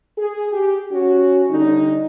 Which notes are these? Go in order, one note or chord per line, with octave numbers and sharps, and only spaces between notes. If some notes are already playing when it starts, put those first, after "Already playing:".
G#4
G4
C#4 F#4
D3 G3 D#4